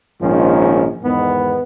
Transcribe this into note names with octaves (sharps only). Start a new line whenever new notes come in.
A#1 G#2 D#3 F3 C#4
E2 G#2 D#3 B3